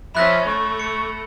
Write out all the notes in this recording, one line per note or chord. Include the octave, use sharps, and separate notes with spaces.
F3 C#4 E5 B5 F#6 A#6
A3 C#6
C#7